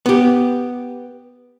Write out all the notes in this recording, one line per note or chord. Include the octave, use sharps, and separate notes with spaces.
B3 G4